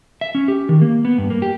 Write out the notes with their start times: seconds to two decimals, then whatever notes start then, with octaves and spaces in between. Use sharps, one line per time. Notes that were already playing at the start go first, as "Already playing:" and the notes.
0.21 E5
0.35 C#4
0.48 G4
0.69 D#3
0.82 A#3
1.05 B3
1.18 G2
1.30 A#3
1.42 G4